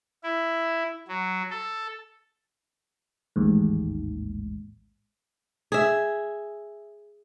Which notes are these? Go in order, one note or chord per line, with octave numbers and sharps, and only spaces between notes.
E4
F#3
A4
A1 D#2 G#2
G#4 E5